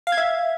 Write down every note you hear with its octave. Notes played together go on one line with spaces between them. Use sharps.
F5
G#6
E5